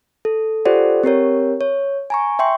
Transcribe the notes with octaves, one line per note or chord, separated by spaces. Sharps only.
A4
F4 G4 A4 C5 D5 F#5
C4 G4 A#4 C#5
C#5
G#5 A#5 C#6
E5 G5 C6 C#6